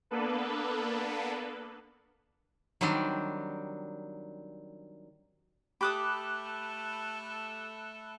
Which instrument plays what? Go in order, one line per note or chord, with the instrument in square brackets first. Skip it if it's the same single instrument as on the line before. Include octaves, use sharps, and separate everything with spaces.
[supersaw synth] A#3 B3 D4 A4 B4
[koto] D#3 F#3 G3 C4 D4
[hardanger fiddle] A3 A4 [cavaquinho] G4 D6 D#6 [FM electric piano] B5 F#6